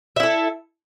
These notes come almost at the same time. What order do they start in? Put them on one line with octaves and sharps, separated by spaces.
E5 E4 A4